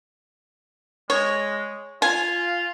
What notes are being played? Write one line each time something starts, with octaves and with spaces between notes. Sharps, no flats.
G#3 C#5
F4 G#5